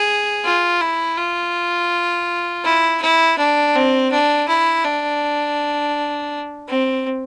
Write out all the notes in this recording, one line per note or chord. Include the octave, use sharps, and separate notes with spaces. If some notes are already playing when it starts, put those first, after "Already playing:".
Already playing: G#4
F4
E4
F4
E4
E4
D4
C4
D4
E4
D4
C4